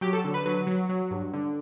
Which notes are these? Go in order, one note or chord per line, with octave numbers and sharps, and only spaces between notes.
F#3 G4
A4
D3
B4
F#3 B4
F#3
F#3
G2
D3